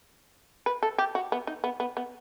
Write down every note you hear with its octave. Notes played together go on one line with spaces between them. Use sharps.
B4
A4
G4
F#4
B3
D#4
B3
B3
B3